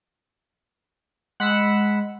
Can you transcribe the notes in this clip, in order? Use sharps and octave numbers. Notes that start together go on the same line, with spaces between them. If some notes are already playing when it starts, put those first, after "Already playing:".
G#3 F#5 B5 E6